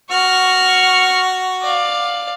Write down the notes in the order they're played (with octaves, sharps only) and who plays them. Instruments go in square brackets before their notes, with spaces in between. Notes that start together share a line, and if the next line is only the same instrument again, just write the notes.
[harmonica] F#4 [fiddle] C#6 F6
[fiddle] D5 F5